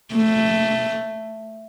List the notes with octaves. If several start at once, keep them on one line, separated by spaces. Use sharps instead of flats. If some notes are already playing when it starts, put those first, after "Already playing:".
A3